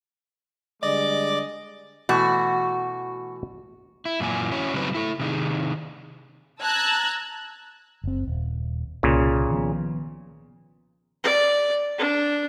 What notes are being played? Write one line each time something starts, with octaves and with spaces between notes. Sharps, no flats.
D3 G3 G#3 D5 D#5 D6
B2 E3 A3 F#4
E4
F#2 A#2 E3 G#5
C#4 E4 F#4 C#5
C#3 F#3 G3 C4 D#4 B4
E4 A4
C3 D#3 G#4
A5 A#5 E6 F#6 G#6
F#1 C4
D#1
C2 A#2 C#3
D#3 F3 B3
D5
D4